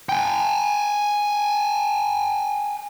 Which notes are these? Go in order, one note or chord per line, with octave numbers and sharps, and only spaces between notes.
G5 G#5